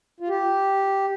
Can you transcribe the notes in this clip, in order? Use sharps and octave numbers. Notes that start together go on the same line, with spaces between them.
F4
G4